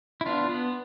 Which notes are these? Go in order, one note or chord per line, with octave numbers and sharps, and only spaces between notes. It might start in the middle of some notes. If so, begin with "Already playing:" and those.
E4
B3 D4 F4
B3